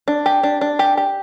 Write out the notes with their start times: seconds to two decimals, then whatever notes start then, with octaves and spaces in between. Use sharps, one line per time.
0.08 D4
0.26 G4
0.43 D4
0.61 D4
0.79 G4
0.97 G4